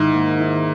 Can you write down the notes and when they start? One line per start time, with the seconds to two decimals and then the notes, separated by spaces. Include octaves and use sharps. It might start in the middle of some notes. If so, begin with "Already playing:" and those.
Already playing: G#2 D#3 E4
0.13 A#3
0.39 E4